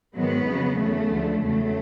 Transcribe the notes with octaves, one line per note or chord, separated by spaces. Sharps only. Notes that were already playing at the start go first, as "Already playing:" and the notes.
G#2 D#3 F#3 B3
F2 C#3 F#3
E2 C#3 E3 A3
D2 D3 F3
E2 C#3 F#3 A3